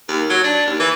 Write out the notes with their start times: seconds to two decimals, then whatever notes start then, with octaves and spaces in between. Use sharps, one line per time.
0.08 D#2
0.30 F#3
0.44 D4
0.67 D#2
0.80 E3